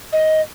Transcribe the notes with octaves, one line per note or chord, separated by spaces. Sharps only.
D#5